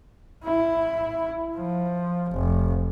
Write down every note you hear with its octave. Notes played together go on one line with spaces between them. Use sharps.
E4
F3
F1